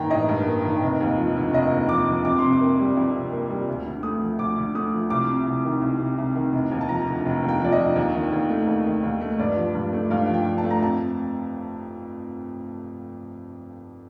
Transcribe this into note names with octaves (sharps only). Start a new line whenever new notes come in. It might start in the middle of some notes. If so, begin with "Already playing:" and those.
Already playing: A1 G2 D#3 A#3 G5 A#5
A1 D#5
G2
A#3
D#3
F1
D#2
F3
D3
F1 D#5
D#2
F3 D6
D3
F2 D6
C3 C6
D6
A#3
G3
F2
C3
A#3
G3
D2
D3
A3 D#6
F3
D2 D6
D3
A3 D#6
F3
C2 D6
C3
C2
D#3
C2
C3
C2
D#3
F1
D#2
A5
F3 A#5
D3
F1
D#2
G5
F3 D5
D#5
D3
D#2
D#3
D#2
A3
D#2
D#3
D#2
A3
G2 D5
F3
G2
A3
G2 F5
F3
G5
G2
A5
A3
A#5
F2 A5